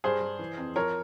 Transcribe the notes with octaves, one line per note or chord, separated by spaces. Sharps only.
G2 G#4 C5
G2
E3
F2
F3 A#4 C#5